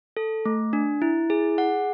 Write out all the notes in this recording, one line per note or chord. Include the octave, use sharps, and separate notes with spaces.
A4
A3
D4
E4
G#4
F#5